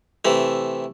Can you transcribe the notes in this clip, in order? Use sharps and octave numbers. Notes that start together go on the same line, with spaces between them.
C3 E3 A3